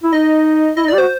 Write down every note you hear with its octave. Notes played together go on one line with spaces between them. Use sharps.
E4
D#4 D#5
E4 D#5
D#4
G4 D5
F#4 C5